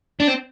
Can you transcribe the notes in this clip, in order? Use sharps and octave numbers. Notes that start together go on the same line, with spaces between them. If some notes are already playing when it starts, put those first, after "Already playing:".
D4
C4